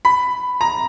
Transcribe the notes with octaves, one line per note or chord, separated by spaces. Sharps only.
B5
A#5